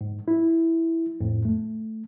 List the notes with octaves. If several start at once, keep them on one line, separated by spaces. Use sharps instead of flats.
G#2
E4
F2 A2
A3